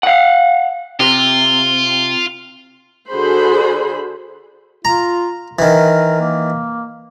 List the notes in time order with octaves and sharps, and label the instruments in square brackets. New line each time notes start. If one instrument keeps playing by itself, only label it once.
[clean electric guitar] F5 F#5
[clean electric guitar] C3 [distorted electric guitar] F4
[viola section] D3 F#4 G#4 C5 B5
[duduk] F4 [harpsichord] A#5
[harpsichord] D#3 E3 [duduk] A#4
[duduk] A#3